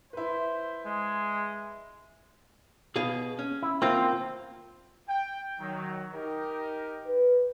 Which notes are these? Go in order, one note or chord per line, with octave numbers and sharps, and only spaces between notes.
E4 B4 C5
G#3 G#4
B2 G#4 F5
C#4
E4
A#3 C4 F4
G5
D#3 F#3
D#4 G4 A#4
B4